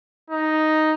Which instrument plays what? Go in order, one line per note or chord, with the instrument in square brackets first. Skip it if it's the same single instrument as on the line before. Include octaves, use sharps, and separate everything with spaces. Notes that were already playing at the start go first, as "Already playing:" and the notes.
[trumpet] D#4